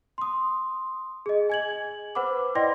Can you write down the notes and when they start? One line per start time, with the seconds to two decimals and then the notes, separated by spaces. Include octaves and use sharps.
0.18 C6 D#6
1.26 G#4 D#5
1.50 G#5 G#6 F#7
2.15 B4 C5 F#5 B5 D6
2.55 E4 D5 D#5 G5 C6 A#6